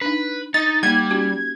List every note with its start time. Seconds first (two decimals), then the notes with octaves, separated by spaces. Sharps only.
0.02 D4 D#4 B4
0.54 D#4 D#5 A6
0.83 G3 A#3 D#4 G#6
1.11 C#4 F#4 G4